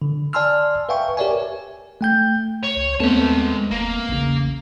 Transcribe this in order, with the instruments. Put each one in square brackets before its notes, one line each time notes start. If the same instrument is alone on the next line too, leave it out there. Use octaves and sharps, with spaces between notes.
[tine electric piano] D3
D5 G#5 A5 C6 E6 F6
B4 E5 F5 G5 G#5 C#6
G4 A#4 C#5 D5 E5 G#5
G#5
A3 G5 G6
[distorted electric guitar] C#5
[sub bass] C#2
[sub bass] D#2 [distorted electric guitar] G#3 A5 [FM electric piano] A3 B3 C4
[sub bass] F1 [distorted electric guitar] A#3
[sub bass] A#1 [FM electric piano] E2 C#3